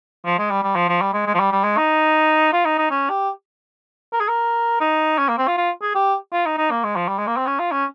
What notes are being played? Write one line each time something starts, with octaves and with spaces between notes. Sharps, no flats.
F3
G#3
G3
G3
F3
F3
G3
G#3
G#3
F3
G3
G3
G#3
D#4
F4
D#4
D#4
C#4
G4
A#4
G#4
A#4
D#4
C#4
A#3
C4
F4
F4
G#4
G4
F4
D#4
D#4
A#3
G#3
F3
G3
G#3
A#3
C4
C#4
F4
C#4